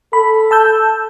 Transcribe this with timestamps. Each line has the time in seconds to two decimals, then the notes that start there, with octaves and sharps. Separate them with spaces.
0.13 A4 B5
0.51 A5 E6 G6